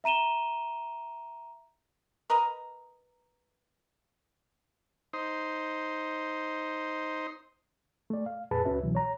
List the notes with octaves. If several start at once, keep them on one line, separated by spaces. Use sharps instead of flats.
E5 A#5 D#7 E7 G7
A#4 B4 D#5 A#5
D#4 C5
A3 D5
F5
F2 A#2 G#4 B4 A5 B5
C#2 C#4 F#4 B4 E5
C2 B2 E3 F#3
C#5 A#5